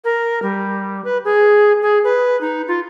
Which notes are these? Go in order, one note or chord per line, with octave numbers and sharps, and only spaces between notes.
A#4
G3
B4
G#4
G#4
B4
D#4
F4